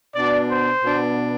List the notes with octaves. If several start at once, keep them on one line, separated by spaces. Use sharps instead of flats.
B2 B3 D4 D5
C5
B2 B3 D4